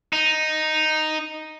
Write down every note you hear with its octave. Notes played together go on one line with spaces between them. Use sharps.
D#4